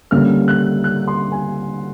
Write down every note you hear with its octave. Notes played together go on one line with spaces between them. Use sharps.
D3 G3 A#3 C#4 F6
F#6
F#6
C6
G#5